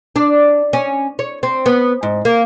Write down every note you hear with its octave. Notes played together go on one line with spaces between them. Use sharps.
D4
C#4
C#5
C4
B3
G#2
A#3